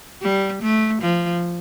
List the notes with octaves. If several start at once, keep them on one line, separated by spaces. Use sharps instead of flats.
G3
A3
F3